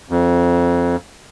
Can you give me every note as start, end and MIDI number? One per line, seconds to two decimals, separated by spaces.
0.10 0.96 41